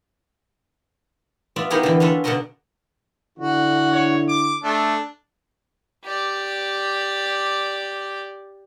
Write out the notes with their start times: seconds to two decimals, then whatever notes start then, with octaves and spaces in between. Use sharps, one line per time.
1.56 B3 F4 D5 E5
1.70 B3 D#4 E4 G4 G#4 A#4
1.83 D3 E3
2.00 C#4 D4 F4 A4 B4
2.24 B2 D3 D4 F#4 A#4 D#5
3.39 D3 D4 E4 F#4
3.93 C#5
4.28 D6
4.64 A3 D4
6.05 G4 D5